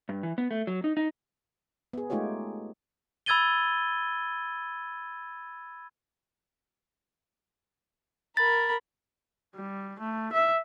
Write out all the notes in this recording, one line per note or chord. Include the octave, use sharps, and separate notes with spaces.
G2
E3
B3
A3
F#3
D#4
D#4
B3 G#4
G#3 A3 D#4 F4 G4 C#5
B5 E6 G#6 A6 D#7 G7
A#4 B5 A6
G3
A3
E5